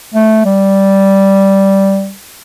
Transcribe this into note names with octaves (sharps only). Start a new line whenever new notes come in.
A3
G3